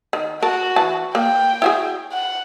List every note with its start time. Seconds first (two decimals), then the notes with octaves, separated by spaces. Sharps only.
0.13 D#3
0.42 F#4 A#4 A5
0.76 E3 A5
1.15 A#3 G5
1.62 E4 F#4 G#4
2.12 F#5